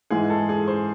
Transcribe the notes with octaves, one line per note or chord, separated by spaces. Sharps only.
G#2 E3 G#3 G#4
A4
G#4
C5